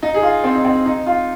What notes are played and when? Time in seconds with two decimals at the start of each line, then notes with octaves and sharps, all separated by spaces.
0.03 D#4
0.14 G#4
0.23 F4
0.44 C4
0.55 D#4
0.64 C4
0.86 D#4
1.06 F4